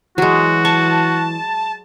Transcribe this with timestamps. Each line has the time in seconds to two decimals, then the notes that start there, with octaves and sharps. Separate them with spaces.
0.18 E3 F#3 G#3 F#4
0.65 A5 C#6